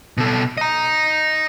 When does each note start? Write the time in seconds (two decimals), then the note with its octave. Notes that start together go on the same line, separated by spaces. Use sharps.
0.17 B2 A4
0.57 D#5 A#5